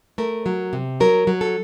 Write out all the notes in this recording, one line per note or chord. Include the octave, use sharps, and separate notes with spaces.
A3 A#4
F#3
C3
F#3 A#4
F#3
A4